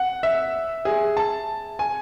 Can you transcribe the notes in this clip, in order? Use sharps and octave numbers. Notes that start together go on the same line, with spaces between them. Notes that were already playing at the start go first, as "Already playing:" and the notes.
Already playing: F#5
E5
G#4
A5
G#5